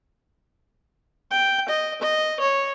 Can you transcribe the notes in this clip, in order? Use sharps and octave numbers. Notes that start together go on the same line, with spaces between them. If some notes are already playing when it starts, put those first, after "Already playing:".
G5
D#5
D#5
C#5